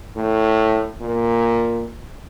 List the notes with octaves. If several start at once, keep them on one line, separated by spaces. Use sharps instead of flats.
A2
A#2